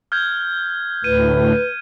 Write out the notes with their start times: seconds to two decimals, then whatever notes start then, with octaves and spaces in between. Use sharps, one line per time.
0.12 F6 G6 G#6
1.04 D2 A2 B4 D#7